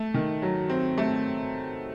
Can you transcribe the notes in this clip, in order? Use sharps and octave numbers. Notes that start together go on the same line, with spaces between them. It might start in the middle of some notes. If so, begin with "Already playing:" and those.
Already playing: A3
D#3
F#3
C4
A3